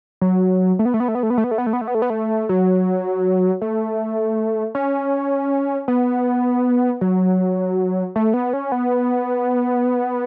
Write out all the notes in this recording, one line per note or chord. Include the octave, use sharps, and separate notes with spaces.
F#3
A3
B3
A3
B3
A3
B3
A3
B3
A3
B3
A3
B3
A3
B3
A3
B3
A3
B3
A3
F#3
A3
C#4
B3
F#3
A3
B3
C#4
B3